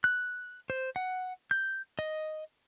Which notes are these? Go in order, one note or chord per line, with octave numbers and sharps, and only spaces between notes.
F#6
C5
F#5
G6
D#5